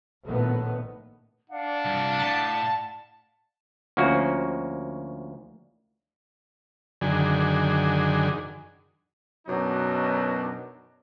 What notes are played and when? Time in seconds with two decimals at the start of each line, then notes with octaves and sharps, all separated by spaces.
0.23 A#1 A2 D#3 B3
1.50 D4 D5 F5 F#5
1.85 C2 G2
2.19 A2 A5
3.97 D2 F3 A#3 C#4 F#4
7.01 F#2 D3 D#3 G#4
9.47 F#2 B2 F#3 D4 D#4